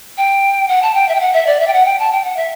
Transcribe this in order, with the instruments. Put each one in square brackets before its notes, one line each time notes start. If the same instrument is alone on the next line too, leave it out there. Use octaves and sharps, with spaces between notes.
[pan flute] G5
F#5
A5
G5
E5
G5
F#5
E5
D5
E5
G5
F#5
G5
A5
G5
F#5
E5